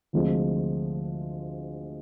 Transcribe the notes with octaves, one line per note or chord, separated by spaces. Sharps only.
D2 C3 F3 G#3